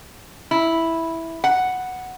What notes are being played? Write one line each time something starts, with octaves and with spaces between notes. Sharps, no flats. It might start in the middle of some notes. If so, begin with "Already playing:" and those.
E4
F#5